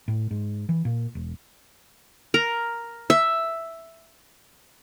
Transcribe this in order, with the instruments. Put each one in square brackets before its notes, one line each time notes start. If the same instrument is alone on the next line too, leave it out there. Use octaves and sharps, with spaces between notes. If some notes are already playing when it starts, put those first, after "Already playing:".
[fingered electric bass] A2
G#2
E3
A#2
E1
[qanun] A#4
E5